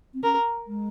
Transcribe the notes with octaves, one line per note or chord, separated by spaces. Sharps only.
C4
C#4 A#4
G#3